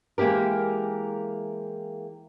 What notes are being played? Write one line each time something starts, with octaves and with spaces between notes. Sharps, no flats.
E3 G#3 A#3 G4 A#4